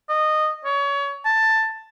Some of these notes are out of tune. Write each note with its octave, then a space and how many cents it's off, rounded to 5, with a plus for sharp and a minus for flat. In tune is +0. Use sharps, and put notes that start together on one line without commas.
D#5 -15
C#5 +25
A5 +10